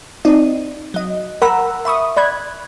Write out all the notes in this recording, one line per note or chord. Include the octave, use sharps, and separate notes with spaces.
C4 D#4 D5 D#5
F#3 D#5
A#4 F#5 A#5 B5 E6
E5 B5 C#6 D#6
D5 B5 F#6 G#6